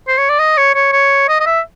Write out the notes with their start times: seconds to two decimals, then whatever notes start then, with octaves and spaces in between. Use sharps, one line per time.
0.08 C5
0.18 C#5
0.29 D5
0.39 D#5
0.57 C#5
0.75 C#5
0.92 C#5
1.28 D#5
1.40 D#5
1.46 E5